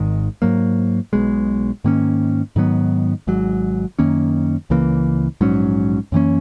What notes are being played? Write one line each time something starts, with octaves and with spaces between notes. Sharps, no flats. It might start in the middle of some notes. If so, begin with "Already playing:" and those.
Already playing: G#1 G#2 D#3 G#3
G#2 F#3 A#3
B1 B2 G#3
G#2 D#3 A#3 C#4
G#2 D#3 F#3 B3
G#1 G#2 F#3
F#2 D#3 A#3 C#4
C#2 C#3 E3 A#3
A#1 G#2 F#3 C#4
F#2 E3 A#3 C#4